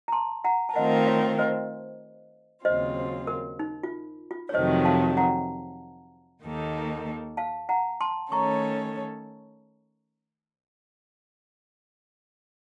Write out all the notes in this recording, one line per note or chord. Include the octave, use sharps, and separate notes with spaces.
A#5
A5 C6
F#5 A#5
A5
D#3 A3 C4 F4 A#4 D#5 F#5
C#5 F5
C5 D#5
D#2 C#3 F#3 C4 F4 C5 D#5
A#4
D#4
F4
F4
C#5
F2 C3 D#3 F#3 A3 C5 D#5
F5 A5
F#5 A#5
D#2 D#3 A#3 D#4 A4
F5 A5
F#5 A#5
A5 C6
D#3 A3 C#4 A4 C#5 A#5 C#6